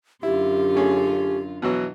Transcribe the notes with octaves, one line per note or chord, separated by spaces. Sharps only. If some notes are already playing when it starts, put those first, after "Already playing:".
F#2 D3 E4 F4 G4
A3 C#4 G#4
B2 E3 F#3